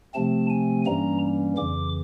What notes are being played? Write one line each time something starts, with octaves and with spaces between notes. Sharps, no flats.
C3 F3 A3 C4 A5
G#5
G2 E3 G3 A#3 C#4 A#5
F2 C#3 E3 D6